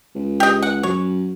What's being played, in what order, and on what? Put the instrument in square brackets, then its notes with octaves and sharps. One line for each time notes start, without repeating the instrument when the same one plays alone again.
[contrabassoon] C#2
[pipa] G4 D#5
F#5
[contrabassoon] F#2 [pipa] C#5